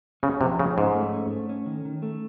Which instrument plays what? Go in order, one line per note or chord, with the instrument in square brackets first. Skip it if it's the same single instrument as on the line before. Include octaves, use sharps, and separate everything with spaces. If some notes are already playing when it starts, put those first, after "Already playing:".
[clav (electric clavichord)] C#3 [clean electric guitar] C#4
[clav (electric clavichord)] C3 [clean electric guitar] F3
[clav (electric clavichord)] C#3 [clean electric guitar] C#4
[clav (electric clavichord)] G#2 [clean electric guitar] C#4
[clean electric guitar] A3
C#4
A3
C#4
D#3
D#3
A3